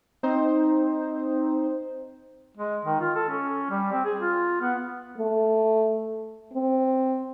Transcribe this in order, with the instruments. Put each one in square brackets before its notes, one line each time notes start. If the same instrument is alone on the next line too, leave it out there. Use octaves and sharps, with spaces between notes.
[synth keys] C4 D#4 C5
[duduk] G#3
D#3
F4
A4
C#4
G3
C4
G#4
F4
B3
[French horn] A3
C4